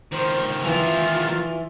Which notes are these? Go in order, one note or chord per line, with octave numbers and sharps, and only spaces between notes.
D#3 F3 C5
E3 F4